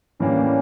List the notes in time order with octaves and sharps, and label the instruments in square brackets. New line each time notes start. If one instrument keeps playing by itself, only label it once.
[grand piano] A2 E3 G3 A#3 D4 [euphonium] C#4